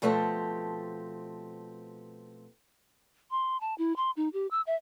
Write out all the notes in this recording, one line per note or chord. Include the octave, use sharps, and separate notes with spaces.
B2 F3 A3 C4 G4 A5
C6
A5
E4
C6
D#4
G4
E6
E5